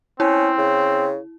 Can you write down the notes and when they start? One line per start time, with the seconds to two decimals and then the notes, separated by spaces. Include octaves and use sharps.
0.20 C4 C#4 E4
0.58 C#3